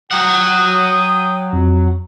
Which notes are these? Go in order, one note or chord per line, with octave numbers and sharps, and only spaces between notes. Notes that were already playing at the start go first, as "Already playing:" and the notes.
F#3 F#5 G5 D#6
F2